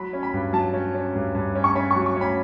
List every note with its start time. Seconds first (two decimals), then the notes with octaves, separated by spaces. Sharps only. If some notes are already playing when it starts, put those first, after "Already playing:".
Already playing: F#3 B5
0.13 C#4
0.23 B5
0.33 G2
0.53 F#3 A5
0.74 C#4
0.94 C#4
1.15 G2
1.35 G2
1.55 C#4
1.64 C#6
1.75 C#4 B5
1.91 F#3 C#6
2.06 C#6
2.16 C#4 B5